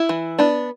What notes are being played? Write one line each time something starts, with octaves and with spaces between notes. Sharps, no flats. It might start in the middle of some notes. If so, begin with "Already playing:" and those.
Already playing: E4
E3
B3 D4